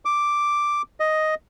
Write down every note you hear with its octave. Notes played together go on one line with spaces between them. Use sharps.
D6
D#5